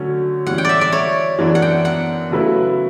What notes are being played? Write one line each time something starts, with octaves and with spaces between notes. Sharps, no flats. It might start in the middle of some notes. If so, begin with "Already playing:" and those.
Already playing: D3 F#3 A3 C#4 F#4
E3 G3 C#4 F#5
G5
D5 E5
D5
C#5
F#2 E3 B3 D4
F#5
G5
F#5
C#3 F#3 A3 E4 B4